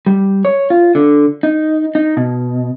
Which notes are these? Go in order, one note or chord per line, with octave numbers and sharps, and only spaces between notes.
G3
C#5
F4
D3
D#4
D#4
B2